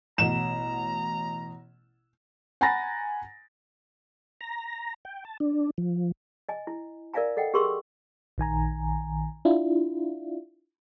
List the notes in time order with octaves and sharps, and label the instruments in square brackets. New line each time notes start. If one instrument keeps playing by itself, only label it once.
[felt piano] A1 B2 [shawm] A#5 [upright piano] E7
[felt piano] F#5 G#5 A#5 B5 A6 A#6
[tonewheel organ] A#5
G5
A5
D4
F3
[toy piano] D#5 G#5
E4
A#4 D5 E5 F5 G#5 A#5
A4 D#5 F#5 G5
G4 G#4 A#4 C6 C#6 E6
[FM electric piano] A#1 D#3 G#5 A#5
D4 E4 F4